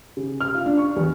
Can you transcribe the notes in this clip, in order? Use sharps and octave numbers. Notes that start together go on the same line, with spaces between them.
C#3
F6
F4
D4
C#6
E2